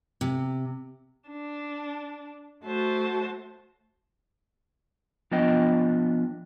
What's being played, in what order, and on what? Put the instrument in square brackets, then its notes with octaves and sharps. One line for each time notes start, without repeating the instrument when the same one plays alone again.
[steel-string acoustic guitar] C3
[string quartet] D4
A3 F#4 C5 A5
[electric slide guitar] F3 B3 D4 F4 D#5 G5